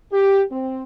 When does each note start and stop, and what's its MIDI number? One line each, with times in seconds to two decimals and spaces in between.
0.12 0.43 67
0.50 0.83 60